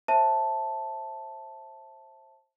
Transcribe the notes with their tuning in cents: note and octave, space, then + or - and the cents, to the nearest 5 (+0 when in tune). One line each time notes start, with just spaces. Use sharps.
C5 +25 E5 -5 A5 +0